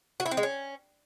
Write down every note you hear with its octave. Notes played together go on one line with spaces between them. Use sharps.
F#4
E4
C4
G#3
C#4